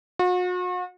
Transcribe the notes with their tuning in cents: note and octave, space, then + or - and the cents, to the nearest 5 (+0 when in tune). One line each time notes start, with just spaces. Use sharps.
F#4 -40